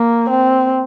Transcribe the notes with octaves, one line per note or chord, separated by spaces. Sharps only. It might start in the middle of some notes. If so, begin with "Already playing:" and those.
Already playing: A#3
C4